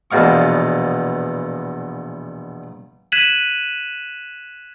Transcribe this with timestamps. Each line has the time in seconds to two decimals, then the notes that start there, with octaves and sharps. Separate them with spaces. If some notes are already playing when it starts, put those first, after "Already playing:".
0.11 A#1 E2 B2 F5 C#6
3.12 F#6 G#6 B6 D#7 E7 F#7